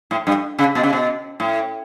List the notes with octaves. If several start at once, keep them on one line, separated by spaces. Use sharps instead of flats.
A2
G2
C#3
B2
C#3
B2
A2